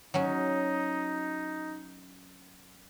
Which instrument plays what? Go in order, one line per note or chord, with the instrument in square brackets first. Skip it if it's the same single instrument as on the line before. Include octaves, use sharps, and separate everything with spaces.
[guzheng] F#3 C#4 [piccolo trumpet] D#4